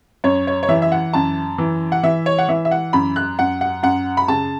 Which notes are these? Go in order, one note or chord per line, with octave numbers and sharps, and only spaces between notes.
F#2 C#5
C#5
C#5
E3 E5
E5
F#5
F#2 A5
E3
F#5
E3 E5
C#5
F#5
E3 E5
E5
F#5
F#2 B5
F#6
F#2 F#5
F#5
F#2 F#5
B5
C#3 A5